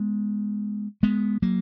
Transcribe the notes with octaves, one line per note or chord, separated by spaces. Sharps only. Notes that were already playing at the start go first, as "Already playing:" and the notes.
Already playing: G#3 B3
G#3 B3
F#3 A#3